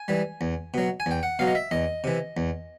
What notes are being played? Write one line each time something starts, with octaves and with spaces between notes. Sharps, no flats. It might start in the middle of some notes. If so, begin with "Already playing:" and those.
Already playing: G#5
E3 G3
E2
B2 F#3
G#5
E2 G5
F#5
B2 F#3 F5
D#5
E5
E2 D#5
C3 E3
E2